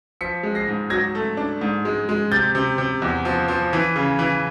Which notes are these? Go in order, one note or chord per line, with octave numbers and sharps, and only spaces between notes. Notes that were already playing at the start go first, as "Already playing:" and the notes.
F3 B6 C#7
G#3
A#6 C7
G#2
F#3 G#6 A#6
A3
D4
G#2
G#3
G#3
C3 G6 A6
C3
C3
E2
F3
F3
E3
C#3
E3